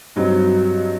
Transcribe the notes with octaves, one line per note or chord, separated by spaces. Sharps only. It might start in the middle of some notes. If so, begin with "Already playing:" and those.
G2 F#3 C4 D#4